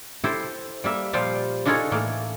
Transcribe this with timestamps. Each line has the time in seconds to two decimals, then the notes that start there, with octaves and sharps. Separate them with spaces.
0.24 E4 G4 A4 C5
0.84 G3 A#3 E5
1.13 A#2 F3 G3 F4 C5 F5
1.65 D4 D#4 F4 G#4 A4 C#5
1.92 A2 E3 A#3